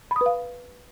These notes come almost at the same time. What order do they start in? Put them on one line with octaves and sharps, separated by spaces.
B5 D#6 B4 F5